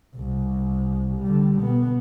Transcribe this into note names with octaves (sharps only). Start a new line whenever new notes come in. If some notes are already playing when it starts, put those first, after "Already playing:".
C2
D3 G3
B2 B3